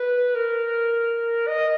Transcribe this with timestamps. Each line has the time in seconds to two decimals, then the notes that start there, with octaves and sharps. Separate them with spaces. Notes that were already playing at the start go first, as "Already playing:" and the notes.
Already playing: B4
0.35 A#4
1.48 D#5